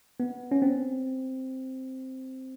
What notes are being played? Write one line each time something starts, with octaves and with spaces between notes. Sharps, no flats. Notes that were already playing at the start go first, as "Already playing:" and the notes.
B3
C#4
C4